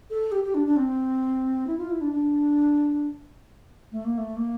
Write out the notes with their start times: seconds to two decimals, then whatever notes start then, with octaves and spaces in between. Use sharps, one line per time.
0.10 A4
0.32 G4
0.44 G4
0.54 D4
0.66 D4
0.76 C4
1.67 E4
1.78 F4
1.90 E4
2.01 D4
2.12 D4
3.92 A3
4.04 A#3
4.18 A3
4.36 A#3